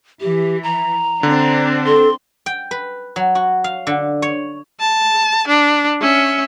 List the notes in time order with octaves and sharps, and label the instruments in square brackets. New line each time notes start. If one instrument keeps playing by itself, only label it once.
[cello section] E3 [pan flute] G4
[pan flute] A#5
[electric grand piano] D3 [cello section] C4 D4
[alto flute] A4 [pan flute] C6
[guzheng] G5
B4
F#3
F#4
F5
D3
C#5
[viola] A5
D4
C#4 E5